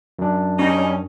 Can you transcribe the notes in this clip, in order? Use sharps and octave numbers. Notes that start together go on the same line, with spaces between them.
F#2 D4
G3 C#4 D#4